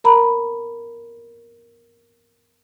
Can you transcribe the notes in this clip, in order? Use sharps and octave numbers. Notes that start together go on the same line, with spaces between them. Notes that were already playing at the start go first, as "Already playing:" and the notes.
A#4 A#5 B5